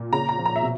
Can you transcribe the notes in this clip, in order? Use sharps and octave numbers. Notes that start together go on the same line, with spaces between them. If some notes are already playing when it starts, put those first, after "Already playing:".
Already playing: A#2
C#3 A#5
A#5
F3
A#5
E5
B2